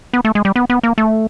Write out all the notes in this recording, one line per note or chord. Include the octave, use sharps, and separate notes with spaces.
B3
A3
G#3
G3
B3
B3
A#3
A3